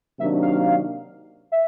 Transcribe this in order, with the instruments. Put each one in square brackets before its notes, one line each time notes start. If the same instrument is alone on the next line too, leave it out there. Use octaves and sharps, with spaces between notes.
[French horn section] C3 D#3 F#3 A#3 D4 [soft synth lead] E5
[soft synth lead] F5
E5